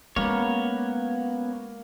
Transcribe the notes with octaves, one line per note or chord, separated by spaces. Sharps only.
G#3 A#3 B3 C#4 F#4 C#5